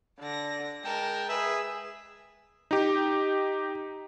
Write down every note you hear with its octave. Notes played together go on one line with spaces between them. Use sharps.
D3 D5 A#6
G#3 A#4 G5 A5
G#4 B4 E5
D#4 G4